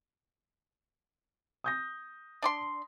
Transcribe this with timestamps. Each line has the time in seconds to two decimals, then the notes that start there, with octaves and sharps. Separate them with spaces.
1.64 D#6 G6 A#6
2.42 D4 D5 C6